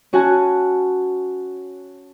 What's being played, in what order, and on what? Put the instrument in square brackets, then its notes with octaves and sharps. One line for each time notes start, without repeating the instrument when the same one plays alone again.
[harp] C#4 F#4 F#5 G#5 A5